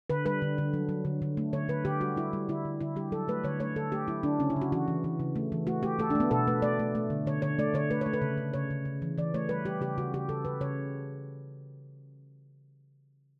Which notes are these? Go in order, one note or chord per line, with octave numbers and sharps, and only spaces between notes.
D3 B4
G3 B4
D3
D3
F#3
F#3
D3
D3
A3
D3 C#5
D3 B4
D3 G4
G3 F#4
G3 E4
G3
D3 E4
D3
D3 E4
G3 G4
F#3 A4
A3 B4
D3 C#5
A3 C#5
D3 A4
A3 G4
F#3 E4
D3 D4
C#3 C#4
E4
C#3
F#4
E3 F#4
E3
E3
C#3
A3
E3
A3 F#4
A3 G4
A3 A4
D4
A3 B3
B2 A4
A3 B4
A3 D5
A3
A3
D3
D3 C#5
D3 C#5
A3 D5
D3 C#5
A3 B4
A3 C#5
B4
C#3
C#3
C#3 C#5
C#3
C#3
E3
E3 D5
A3 C#5
G3 B4
G3 G4
C#3 G4
C#3 F#4
C#3 G4
C#3 A4
C#3 B4
C#3 C#5